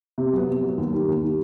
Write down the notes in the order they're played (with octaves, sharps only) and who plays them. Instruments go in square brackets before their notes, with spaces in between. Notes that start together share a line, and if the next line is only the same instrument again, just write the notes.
[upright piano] C3
F#3 B3
C3
F#3 B3
D#2
D#3 G3
D#2
D#3 G3